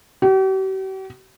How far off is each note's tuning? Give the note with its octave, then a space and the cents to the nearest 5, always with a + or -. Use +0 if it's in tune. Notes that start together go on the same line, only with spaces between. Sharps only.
G4 -45